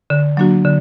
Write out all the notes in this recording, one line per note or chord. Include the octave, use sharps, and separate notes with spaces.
D3
F#3 A#3 D4 F#4
D3